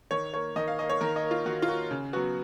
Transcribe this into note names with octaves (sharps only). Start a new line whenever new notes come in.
D#3 C#5
A#3 C#5
D#3 D#5
F5
A#3 D#5
C#5
D#3 A#4
D#5
A#3
F4
D#3 F#4
F4
A#3 F#4
C#3
F#3 B3 F#4